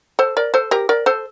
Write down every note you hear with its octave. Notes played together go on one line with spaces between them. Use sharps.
A4 C5
A#4 D5
A4 C5
G4 A#4
A#4 D5
A4 C5